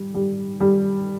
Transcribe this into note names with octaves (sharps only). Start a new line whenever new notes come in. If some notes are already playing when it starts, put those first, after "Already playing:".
Already playing: G3
G3
G3